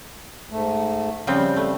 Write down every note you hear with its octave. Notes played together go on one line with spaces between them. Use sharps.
G#2 A3
C#3 F3 G3 C4
A3